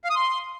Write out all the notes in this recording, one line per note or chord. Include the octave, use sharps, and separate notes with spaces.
F5
D#6
C6